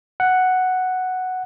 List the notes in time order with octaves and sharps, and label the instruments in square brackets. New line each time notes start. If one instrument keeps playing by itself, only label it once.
[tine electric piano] F#5